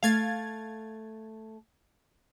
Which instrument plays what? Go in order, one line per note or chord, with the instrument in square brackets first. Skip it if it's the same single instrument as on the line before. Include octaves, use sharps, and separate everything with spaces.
[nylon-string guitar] A3 E5 [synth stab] F5 G#6 A6